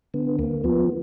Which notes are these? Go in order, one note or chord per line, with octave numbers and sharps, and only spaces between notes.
D3 B3
D2 A#3
F3 B3